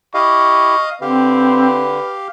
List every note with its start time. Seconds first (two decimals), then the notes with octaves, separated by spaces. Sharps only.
0.14 E4 G4 D#5 F5 C#6
1.01 D3 C4 G4 B4 F5